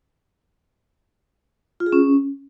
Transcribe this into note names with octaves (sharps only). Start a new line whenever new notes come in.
F4
G#4
C#4